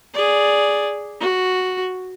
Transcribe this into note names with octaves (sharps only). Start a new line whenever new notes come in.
G#4 D5
F#4